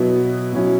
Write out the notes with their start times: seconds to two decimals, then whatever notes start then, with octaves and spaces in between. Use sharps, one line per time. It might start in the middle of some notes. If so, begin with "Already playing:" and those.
Already playing: B2 F#3 B3 E4
0.53 B2 F#3 C#4 E4